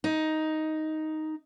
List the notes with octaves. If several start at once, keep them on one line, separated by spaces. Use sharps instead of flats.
D#4